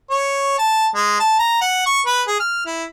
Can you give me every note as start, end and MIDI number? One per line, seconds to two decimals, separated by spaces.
0.10 0.54 73
0.59 0.86 81
0.95 1.15 56
1.20 1.35 81
1.39 1.58 82
1.61 1.81 78
1.86 2.01 85
2.06 2.22 71
2.27 2.39 68
2.40 2.65 89
2.66 2.84 64